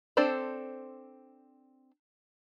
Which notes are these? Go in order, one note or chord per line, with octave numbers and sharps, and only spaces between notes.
C4 D4 A4 C5 D5